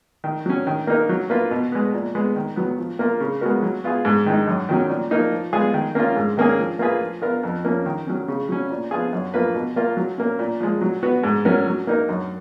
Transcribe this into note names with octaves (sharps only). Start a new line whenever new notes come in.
D#3
F#3 C#4
D#3
A#3 D#4 A#4
F#3
A#3 F4 B4
B2
G#3 B3
A#2
G#3 B3
D#3
F#3 B3
F3
A#3 F4 A#4
C#3
G#3 B3 F#4 A#4
F#3
B3 F4 G#4
G#2
D#3 G#3 D#4
F#2
D#3 F#3 C#4
A#2
F3 A#3 D#4
F3
G#3 B3 F4 G#4
D#3
A#3 C#4 F4
G#2
D#3 A#3 C#4 G#4
F3
A#3 F4 G#4 B4
F3
B3 F4 A#4
F2
F3 A#3 C#4
D#3
F#3 C#4
C#3
F#3 C#4
A#2
F3 B3 F4 G#4
F#2
F3 A#3 F4 B4
B2
A#3 F4 A#4
F#3
A#3 C#4
A#2
F3 G#3
F#3
B3 F#4 B4
G#2
F#3 C#4 F#4 A#4
F#3
A#3 D#4 A#4
F#2